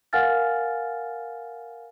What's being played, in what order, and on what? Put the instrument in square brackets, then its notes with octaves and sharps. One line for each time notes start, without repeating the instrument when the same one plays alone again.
[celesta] A#4 F5 F#5 G#5 F6 A6